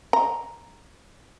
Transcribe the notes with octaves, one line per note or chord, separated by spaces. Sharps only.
A#5